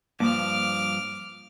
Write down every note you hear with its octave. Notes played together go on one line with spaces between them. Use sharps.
G2 F3 A#3 D6 F6